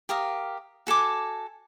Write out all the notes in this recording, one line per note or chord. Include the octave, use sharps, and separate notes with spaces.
G4 A#4 F5 D#6
F#4 A4 G#5 D6